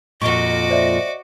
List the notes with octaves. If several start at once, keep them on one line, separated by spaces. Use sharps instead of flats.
F2 A#2 F#4 D#5 C#6 D6 G7
C5 D5 E5